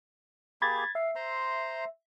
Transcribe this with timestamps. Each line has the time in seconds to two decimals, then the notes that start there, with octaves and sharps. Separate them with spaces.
0.62 A#3 G4 G#4 B5 G#6 A6
0.95 E5 F5
1.16 C5 A#5 C6